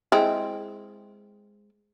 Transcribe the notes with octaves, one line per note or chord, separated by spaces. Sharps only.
G#3 C4 E4